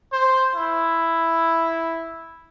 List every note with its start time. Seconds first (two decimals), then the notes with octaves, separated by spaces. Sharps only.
0.12 C5
0.55 E4